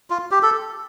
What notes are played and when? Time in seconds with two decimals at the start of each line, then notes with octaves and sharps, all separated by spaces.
0.10 F4
0.31 G4
0.43 A4